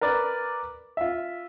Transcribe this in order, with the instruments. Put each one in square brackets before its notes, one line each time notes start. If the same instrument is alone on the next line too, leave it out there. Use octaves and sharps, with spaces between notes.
[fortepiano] A#4 B4 D5
F4 E5